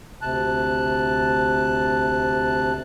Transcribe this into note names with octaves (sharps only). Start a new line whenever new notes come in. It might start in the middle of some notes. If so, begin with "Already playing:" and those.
D2 C3 A5 F#6